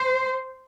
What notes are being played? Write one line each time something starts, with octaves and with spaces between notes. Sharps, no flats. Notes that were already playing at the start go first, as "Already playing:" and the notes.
Already playing: C5